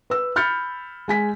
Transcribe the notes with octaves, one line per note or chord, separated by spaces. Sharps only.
B4 E6
B5 F6 G6 A6 C#7
G#3 G#5 B6